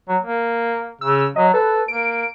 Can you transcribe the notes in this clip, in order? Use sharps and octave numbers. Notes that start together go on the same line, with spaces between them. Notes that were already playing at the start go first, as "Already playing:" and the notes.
F#3
A#3
C#3 E6
F#3 D#5
A4 B4
A#3 D7